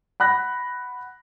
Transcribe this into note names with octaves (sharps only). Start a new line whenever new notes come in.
F#5 B5 F#6 A#6